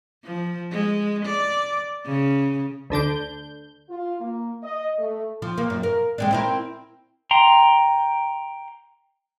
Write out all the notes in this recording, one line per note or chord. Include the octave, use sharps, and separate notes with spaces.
F3
G#3
D5
C#3
D2 D3 D4 G6
F4
A#3
D#5
A3
F3
A#3
F#2
A#4
G#3 C4 D4
C4 E4 A#4
G5 A#5 C6